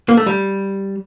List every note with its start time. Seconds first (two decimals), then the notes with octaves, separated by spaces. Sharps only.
0.09 A#3
0.17 A3
0.27 G3